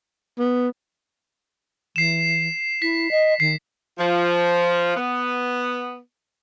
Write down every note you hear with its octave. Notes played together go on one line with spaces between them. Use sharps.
B3
E3 C7 E7
E4 B6
D#5
D#3 C7
F3
B3